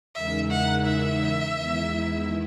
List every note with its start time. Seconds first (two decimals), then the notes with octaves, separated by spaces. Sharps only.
0.15 E2 C#3 G#3 D#4 A#4 E5
0.50 F#5
0.85 E5
1.57 E2 D#3 G#3 B3 E4